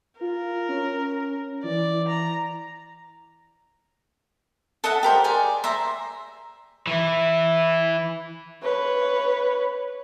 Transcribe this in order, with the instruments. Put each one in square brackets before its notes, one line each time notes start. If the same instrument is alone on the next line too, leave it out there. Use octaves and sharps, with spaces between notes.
[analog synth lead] F4 [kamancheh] A#4
[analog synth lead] C#4
[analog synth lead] E3 [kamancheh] D5
[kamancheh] A#5
[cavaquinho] A4 D#5 E5 F#5
G4 A#4 C5
G#4 D5
C5 E5 A#5
[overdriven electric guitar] E3 E4
[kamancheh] B4 C#5